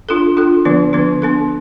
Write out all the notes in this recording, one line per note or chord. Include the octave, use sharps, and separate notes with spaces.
D4 F4 A4
D4 F4 A4
D3 F3 B3 D4
D3 F3 B3 D4
B3 D4 A4